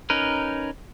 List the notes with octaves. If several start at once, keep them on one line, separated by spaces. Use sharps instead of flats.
C#4 D#4 A#4 B4